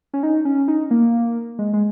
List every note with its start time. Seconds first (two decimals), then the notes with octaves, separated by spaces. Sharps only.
0.14 C#4
0.23 D#4
0.45 C#4
0.68 D#4
0.91 A#3
1.59 G#3
1.73 G#3